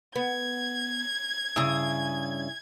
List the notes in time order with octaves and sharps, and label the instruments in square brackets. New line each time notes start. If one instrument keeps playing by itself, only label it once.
[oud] B3 [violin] G#6
[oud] G2 C#3 [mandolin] E4 G#4